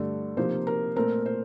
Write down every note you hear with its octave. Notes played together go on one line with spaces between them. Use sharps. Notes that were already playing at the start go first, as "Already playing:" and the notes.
Already playing: G2 D3 A3
C3 F3 A#3 D#4 C5
A#4
A#2 A3 C4 A#4
C5